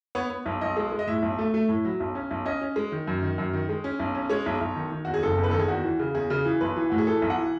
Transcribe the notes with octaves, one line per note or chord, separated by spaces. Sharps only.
B3 C#5
B3
B1
B1 D#5
G#3
G#3
D#5
A2 E5
B1
A3
A3
A2
F#3
B1
C#4
B1
C#4 D#5
C#4
G#3
D#3
F#2
D#3
F#2
D#3
G#3
C#4
B1
C#4
G#3 C#5
B1
B1
D#3
D#3
E2 F#4
G#4
F#1 A4
E2
B4
D#3 A4
G#4
E2 F#4
E3
C#3
E2 G#4
C#3
E3
B1 B4
E3
A2 F#4
G#4
E3 A4
B1
F#5
E3